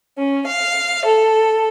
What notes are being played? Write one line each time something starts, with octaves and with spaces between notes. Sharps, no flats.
C#4
F5
A4